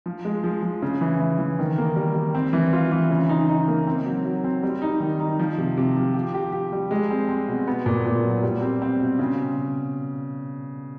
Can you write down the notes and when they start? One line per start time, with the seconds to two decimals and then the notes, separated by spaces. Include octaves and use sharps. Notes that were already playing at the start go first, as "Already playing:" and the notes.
0.06 F3
0.25 G#3
0.44 F3
0.63 F3
0.82 C#3
1.01 E3
1.20 E3
1.39 E3
1.59 D#3
1.78 A#3
1.96 G3
2.15 G3
2.35 C4
2.53 E3
2.73 F4
2.92 E3
3.10 C#3
3.29 D#4
3.49 D#4
3.68 A#3
3.87 C4
4.06 F#3
4.25 F#3
4.44 C4
4.63 G3
4.82 D#4
5.00 D#3
5.20 D#4
5.39 F3
5.58 C3
5.77 C3
5.96 F3
6.14 G4
6.34 G4
6.52 G4
6.73 G3
6.91 G#3
7.11 C4
7.29 C4
7.48 B2
7.68 B3
7.86 A#2
8.06 A#2
8.24 F#3
8.43 G3
8.62 C4
8.82 C4
9.01 B2
9.19 C#3